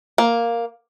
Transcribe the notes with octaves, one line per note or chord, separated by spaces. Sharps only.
A#3